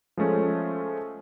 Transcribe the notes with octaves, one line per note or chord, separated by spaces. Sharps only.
F3 G#3 A3 C#4